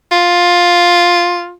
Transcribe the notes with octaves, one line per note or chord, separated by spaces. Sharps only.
F4